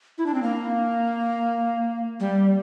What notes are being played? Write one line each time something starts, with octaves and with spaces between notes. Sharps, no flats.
E4
D4
C4
A#3
G3